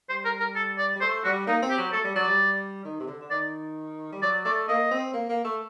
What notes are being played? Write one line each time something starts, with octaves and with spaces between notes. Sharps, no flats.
G3 C5
A#4
A#4
A4
D5
G3
A3 C5
G3 F#4
A#3 D#4
C4
G4
F#3
A3 A4
G3
F#3 D5
G3
D#3
C3
D3
D3
D#3 D5
G3
F#3 D5
A3 D5
A#3 D#5
C4
A#3
A#3
A3